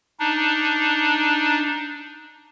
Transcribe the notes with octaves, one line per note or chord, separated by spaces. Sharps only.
D4 D#4